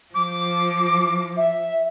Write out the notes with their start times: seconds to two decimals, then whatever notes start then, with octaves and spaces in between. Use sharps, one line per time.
0.15 F3 D6
1.37 E5